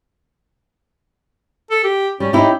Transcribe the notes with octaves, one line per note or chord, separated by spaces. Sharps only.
A4
G4
G3 C#4
C#4 D#4 E4 G4